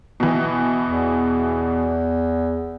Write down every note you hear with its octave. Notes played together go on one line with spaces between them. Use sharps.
B2 E3
E2